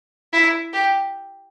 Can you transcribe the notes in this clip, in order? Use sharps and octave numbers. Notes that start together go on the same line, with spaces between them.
E4
G4